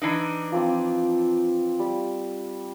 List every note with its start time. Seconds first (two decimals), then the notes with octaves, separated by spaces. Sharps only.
0.02 E3 D4 D#4
0.52 F3 C4 D6
1.79 G3